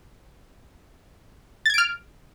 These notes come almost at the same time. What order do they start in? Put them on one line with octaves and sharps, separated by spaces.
A6 G#6 D7 F6